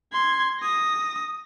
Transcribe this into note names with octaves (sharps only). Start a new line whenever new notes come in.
C6 G#6
D#6 A#6